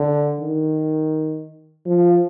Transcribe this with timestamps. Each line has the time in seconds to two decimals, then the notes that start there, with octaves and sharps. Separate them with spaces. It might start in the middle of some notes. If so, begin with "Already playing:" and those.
Already playing: D3
0.41 D#3
1.86 F3